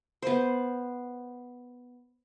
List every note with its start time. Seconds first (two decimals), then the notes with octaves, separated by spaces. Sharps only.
0.22 B3 C5